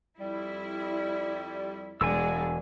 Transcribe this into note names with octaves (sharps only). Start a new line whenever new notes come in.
F2 G3 E4
E1 G#3 D4 G#5 E6